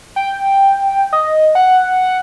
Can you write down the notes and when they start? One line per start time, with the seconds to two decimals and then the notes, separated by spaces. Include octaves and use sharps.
0.16 G5
1.13 D#5
1.55 F#5